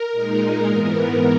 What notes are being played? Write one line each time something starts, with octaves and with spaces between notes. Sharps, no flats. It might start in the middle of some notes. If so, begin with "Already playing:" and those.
Already playing: A#4
A#2 G#3 D#4
G#2 E3 B3